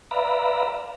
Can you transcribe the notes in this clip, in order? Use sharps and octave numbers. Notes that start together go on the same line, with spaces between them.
B4 D5 E5 F5 A#5 B5